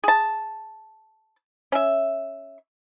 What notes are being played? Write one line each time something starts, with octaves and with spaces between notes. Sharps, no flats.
G#4 A5
C#4 E5